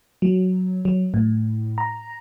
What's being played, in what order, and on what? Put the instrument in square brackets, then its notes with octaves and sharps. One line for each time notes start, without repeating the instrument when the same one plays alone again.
[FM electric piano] F#3
F#3
A2
A#5